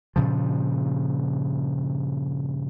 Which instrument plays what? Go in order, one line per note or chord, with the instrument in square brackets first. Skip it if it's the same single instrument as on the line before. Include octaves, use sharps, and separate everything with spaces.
[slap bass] G2 A#2 C#3 F3